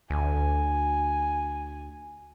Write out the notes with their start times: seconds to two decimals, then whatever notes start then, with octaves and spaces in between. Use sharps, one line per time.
0.10 D2 G#5